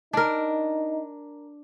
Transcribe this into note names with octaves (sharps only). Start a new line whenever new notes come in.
D4 D#4 A#4